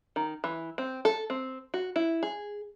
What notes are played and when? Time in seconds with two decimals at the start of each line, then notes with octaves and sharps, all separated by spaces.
0.16 D#3
0.44 E3
0.78 C4
1.05 A4
1.30 C4
1.74 F#4
1.96 E4
2.23 G#4